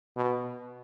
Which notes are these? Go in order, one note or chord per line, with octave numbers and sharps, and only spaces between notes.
B2